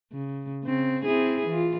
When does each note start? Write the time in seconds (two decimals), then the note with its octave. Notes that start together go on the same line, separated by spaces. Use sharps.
0.12 C#3
0.64 C#3 C4
1.05 C4 E4 G#4
1.47 E3 F4